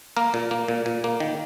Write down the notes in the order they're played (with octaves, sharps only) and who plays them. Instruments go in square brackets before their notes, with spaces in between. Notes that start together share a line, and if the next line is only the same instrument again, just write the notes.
[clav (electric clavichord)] A#3 A#4
A#2
A#3
A#2
A#2
A#3
D#3